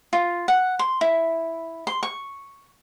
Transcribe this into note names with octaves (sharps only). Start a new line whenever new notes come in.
F4
F#5
C6
E4
C6
C#6